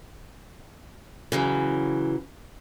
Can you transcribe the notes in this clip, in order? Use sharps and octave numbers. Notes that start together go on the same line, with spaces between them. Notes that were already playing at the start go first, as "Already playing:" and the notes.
C#3 E3 F#3